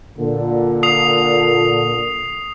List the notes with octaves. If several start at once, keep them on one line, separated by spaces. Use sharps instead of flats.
A#2 D3
D#6 C7 F7